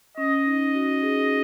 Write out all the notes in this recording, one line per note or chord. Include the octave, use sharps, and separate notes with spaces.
C#4 D#5
D#4
F#4
G#4